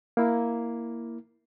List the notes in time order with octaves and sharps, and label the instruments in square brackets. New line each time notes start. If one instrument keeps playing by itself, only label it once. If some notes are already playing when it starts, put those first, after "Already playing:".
[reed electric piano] A#3 E4